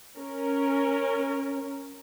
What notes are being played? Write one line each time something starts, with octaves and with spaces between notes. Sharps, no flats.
C#4 A#4